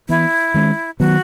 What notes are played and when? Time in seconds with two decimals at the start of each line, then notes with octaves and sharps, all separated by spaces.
0.09 E3 B3 E4
0.54 D#3 G#3 C#4
1.00 D#3 F#3 B3 F#4